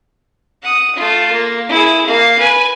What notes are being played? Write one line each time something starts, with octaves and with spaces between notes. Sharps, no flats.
F#5 D#6
A3 F4
A#3
E4 G#4
A#3 F5
B4 G#5